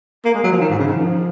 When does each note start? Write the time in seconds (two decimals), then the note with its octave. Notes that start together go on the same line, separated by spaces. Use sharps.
0.25 A#3
0.34 G#3
0.44 F#3
0.52 F3
0.61 D#3
0.70 G#2
0.79 C#3
0.88 D#3
0.97 F3